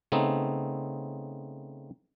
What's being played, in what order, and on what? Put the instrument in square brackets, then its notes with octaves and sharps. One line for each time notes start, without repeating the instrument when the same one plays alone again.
[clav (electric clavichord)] C#3 A3 B3 C4 D#4